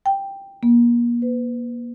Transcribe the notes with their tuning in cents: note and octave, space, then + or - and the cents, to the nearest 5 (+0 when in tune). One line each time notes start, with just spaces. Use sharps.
G5 +5
A#3 +35
B4 +35